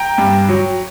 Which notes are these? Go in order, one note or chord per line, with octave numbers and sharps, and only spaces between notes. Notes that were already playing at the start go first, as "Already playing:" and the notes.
Already playing: G5 A#5
G2
F#3